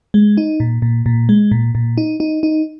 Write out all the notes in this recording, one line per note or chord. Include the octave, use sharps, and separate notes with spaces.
G#3
D#4
A#2
A#2
A#2
G#3
A#2
A#2
D#4
D#4
D#4